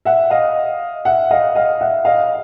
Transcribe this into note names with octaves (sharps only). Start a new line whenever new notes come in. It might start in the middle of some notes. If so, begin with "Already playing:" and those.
E5 F#5
D#5 F5
E5 F#5
D#5 F5
D#5 F5
E5 F#5
D#5 F5